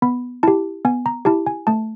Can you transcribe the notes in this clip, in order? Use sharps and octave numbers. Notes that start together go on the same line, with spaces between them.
B3 B5
E4 G4 A5
B3 G#5
A#5
E4 G4 A5
G#5
A3 A5